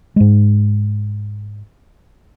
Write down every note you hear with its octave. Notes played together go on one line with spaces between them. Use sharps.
G#2 G#3